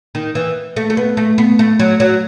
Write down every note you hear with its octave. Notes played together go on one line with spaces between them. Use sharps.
D#3
E3
A3
A3
B3
A3
B3
A3
F#3
F#3